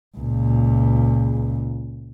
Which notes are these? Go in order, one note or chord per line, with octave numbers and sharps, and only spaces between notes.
C#2 A#2